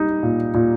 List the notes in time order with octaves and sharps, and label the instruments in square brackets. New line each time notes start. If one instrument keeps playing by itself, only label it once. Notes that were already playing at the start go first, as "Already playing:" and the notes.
Already playing: [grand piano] G3 D#4
A#2
A#2